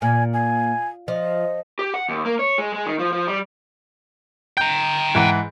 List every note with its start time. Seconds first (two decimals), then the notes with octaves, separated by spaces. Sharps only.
0.02 A#2 G#5
0.33 G#5
1.08 F3 D#5
1.79 G4
1.94 F#5
2.09 D#2
2.25 A#3
2.39 C#5
2.58 G#3
2.74 G#3
2.86 D#3
2.99 F3
3.12 F3
3.27 G3
4.57 G5 A#5 G6
5.15 G#2 E3 F#5